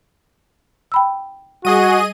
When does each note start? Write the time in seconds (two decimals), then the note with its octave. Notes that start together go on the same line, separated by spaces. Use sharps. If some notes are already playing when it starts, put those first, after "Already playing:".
0.92 G5 B5 E6
1.65 G3 F#4 G#4 D#5 D#7